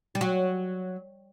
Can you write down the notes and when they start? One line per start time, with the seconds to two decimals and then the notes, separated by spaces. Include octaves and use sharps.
0.15 G3
0.21 F#3